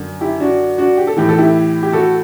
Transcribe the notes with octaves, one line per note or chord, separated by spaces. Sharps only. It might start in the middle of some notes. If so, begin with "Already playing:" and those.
Already playing: F#2 D3
E4 G4
D4 F#4
D4 F#4
G4
A4
A2 E3 G4
A4
E4 G4
G4
F#4 A4